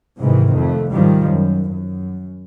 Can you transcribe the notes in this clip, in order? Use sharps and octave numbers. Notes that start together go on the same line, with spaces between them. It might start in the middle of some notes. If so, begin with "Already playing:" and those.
G#2 C3 D#3 E3
F2 A3
G#2 D#3 F3 G3
F#2
F#2